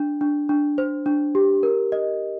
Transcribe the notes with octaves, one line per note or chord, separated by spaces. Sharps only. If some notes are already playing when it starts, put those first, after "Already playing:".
Already playing: D4
D4
D4
C5
D4
G4
A#4
D#5